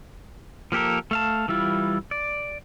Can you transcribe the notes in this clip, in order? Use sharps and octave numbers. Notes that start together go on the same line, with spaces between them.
F3 A#3 G4 A4 A#4
A3 F5 A5
E3 G3 E4 F4
D5